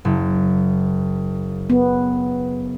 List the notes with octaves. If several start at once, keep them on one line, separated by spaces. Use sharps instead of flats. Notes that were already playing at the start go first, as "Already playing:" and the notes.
F#1
B3